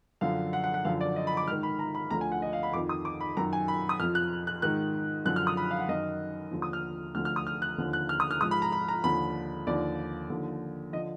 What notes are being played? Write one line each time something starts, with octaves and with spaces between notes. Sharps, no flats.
F#2 D3 F3 F5
F#5
F#5
F#5
F#2 D3 F3 F5
D5
D#5
B5
D6
G#2 D#3 F6
B5
A#5
B5
D2 D3 F3 A#5
G#5
F#5
D#5
F5
B5
F2 D#3 D6
D#6
D6
B5
F#2 D#3 A#5
G#5
B5
D#6
F2 F3 F6
F#6
F#6
G#2 D#3 F#6
F#2 D3 F3 F#6
F6
D#6
B5
F5
F#5
F#2 D#3 D#5
D#2 D3 F3
D#6
F6
D2 D3 F3 F6
F6
D#6
F6
F#6
D#2 D3 F3
F#6
F6
D#6
F6
G#2 F3 D#6
B5
A#5
B5
A#5
D#2 D3 F3 B5
D#2 D3 F3 D5
D#2 D3 F3
D3 F3 D#5